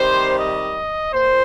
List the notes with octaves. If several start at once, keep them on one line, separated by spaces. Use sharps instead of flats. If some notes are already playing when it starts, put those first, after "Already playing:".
Already playing: C3 D#3 G3 C5
D#5
A#2 C5